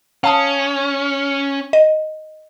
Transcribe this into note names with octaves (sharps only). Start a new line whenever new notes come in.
C#4 F5 A5 D#6
D#5